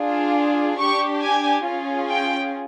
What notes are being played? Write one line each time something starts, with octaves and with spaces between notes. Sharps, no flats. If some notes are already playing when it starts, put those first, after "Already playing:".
Already playing: D4 F4 G#4
D4 G4 C#6
G#5
C#4 F4 G#4
G5